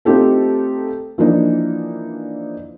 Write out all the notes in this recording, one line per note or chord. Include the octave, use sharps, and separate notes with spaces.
A3 C4 D#4 F4 G4 A4
E3 F3 A#3 D4 D#4